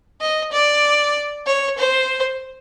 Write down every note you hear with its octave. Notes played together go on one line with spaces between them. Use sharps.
D#5
D5
C#5
C5